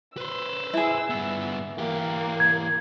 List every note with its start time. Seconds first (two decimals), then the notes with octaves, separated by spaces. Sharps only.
0.17 B4 C5 E6
0.74 E4 G#4
1.10 G2 B3
1.78 E3 A#3 G4
2.40 G#6